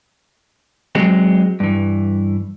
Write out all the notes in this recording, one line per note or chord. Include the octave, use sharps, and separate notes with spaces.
F#3 G#3 C4
G2 E3